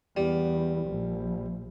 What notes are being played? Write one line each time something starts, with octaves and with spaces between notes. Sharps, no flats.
E2 G3
A#1